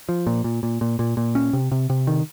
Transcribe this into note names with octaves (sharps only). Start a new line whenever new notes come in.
F3
A#2
A#2
A#2
A#2
A#2
A#2
C#4
C3
C3
C3
D#3